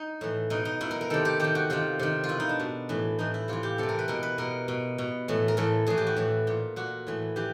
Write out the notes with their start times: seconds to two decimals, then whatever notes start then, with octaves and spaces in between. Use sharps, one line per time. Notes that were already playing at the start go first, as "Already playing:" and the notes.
Already playing: D#4
0.21 A2 E3
0.50 B2 D#4
0.65 D#4
0.81 B2 E4
0.91 A#4
1.01 A#4
1.10 C3 D#3 A4
1.25 G4
1.40 C3 D#3 G4
1.55 F#4
1.70 C3 D#3 F4
1.99 C3 D#3
2.24 F4
2.29 B2 E4
2.40 D#4
2.49 D4
2.60 B2
2.89 A2 E3
3.19 A2 E3 D#4
3.34 E4
3.48 C3 E3 F4
3.63 G4
3.78 C3 E3 A4
3.89 A#4
3.99 B4
4.08 B2 A#4
4.23 B4
4.38 B2 A#4
4.68 B2
4.98 B2
5.28 A2 E3
5.48 A#4
5.57 A2 E3 A4
5.87 A2 E3 G#4
5.97 G4
6.07 F#4
6.16 A2 E3
6.47 A#2
6.76 A#2 F#4
7.07 A2 E3
7.36 E3 G4